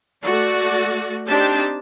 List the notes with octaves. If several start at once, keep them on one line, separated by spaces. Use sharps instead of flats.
A3 F#4 D5
C4 D4 D#4 G4 A5